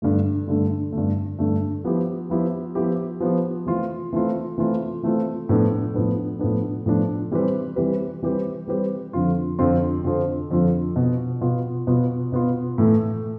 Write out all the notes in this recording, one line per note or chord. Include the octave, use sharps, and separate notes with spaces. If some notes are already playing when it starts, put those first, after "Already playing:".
G2 D3 A3
G2 D3 A3
G2 D3 A3
G2 D3 A3
F3 B3 E4 G4
F3 B3 E4 G4
F3 B3 E4 G4
F3 B3 E4 G4
E3 A3 C4 F4
E3 A3 C4 F4
E3 A3 C4 F4
E3 A3 C4 F4
A2 F3 B3 D4
A2 F3 B3 D4
A2 F3 B3 D4
A2 F3 B3 D4
E3 G3 C4 G4 B4
E3 G3 C4 G4 B4
E3 G3 C4 G4 B4
E3 G3 C4 G4 B4
F2 D3 F3 C4 F4
F2 D3 F3 C4 F4
F2 D3 F3 C4 F4
F2 D3 F3 C4 F4
B2 B3 F4
B2 B3 F4
B2 B3 F4
B2 B3 F4
A2 E3 A3